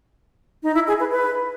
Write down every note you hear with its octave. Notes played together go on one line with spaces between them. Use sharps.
D#4
E4
G#4
B4
B4